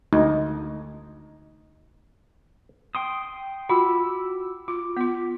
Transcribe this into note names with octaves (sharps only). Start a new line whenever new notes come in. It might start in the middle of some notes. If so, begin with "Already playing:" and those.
D2 D#4
G5 C6 D#6
F4 F#4 B5 D6 E6
F4 D6
B3 F4 B6